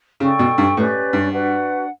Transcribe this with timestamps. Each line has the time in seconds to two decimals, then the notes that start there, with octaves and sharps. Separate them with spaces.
0.20 C#3 A4 D5 G5 C#6
0.39 B2
0.58 G2
0.76 A2 C#4 G4 B4 D5
1.13 G2
1.32 D4 F#4 B4 F#5